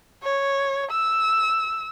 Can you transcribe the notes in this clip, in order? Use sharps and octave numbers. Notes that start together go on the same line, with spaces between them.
C#5
E6